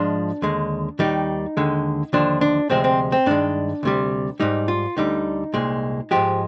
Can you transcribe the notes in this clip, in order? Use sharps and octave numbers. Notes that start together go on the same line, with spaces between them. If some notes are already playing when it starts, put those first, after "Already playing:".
Already playing: G#2 F3 G#3 D4
D#2 D3 G#3
D#2 D#3 G3 D#4
D#2 D3 G#3
D#2 D3 F3 D4
D4
D2 C3 F3 G#3 C4
C4
C4
G2 D#3 G#3 D4
D2 C3 G3
G#2 G3 D#4
F4
D2 D3 G3 D#4
C2 A#2 G#3
G#2 F3 G#3 G4